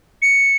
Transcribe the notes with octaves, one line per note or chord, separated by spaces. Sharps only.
C#7